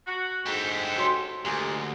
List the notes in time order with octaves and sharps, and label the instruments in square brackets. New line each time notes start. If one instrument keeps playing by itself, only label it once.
[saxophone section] F#4
[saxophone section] D2 G#2 [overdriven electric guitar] G4 A4
[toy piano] F#4 C#5 C6
[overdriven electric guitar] D2 [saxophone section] A#2 G#3 [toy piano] G4